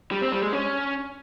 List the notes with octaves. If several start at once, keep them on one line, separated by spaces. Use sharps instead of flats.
G3
C4
G3
G#3
C#4